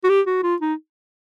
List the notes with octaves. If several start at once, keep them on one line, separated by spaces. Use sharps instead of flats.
F#4
G4
F#4
F4
D#4